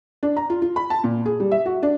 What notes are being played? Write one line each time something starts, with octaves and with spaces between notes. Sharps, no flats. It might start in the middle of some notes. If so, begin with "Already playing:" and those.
D4
A#5
F4
F4
B5
A5
A#2
G#4
G3
E5
F#4
D4